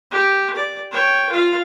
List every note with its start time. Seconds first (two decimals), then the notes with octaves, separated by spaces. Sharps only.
0.11 G4
0.55 D5
0.91 C#5 G5
1.30 F4 F5